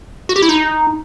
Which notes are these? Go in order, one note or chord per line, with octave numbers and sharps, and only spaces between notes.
F#4
G4
E4
D#4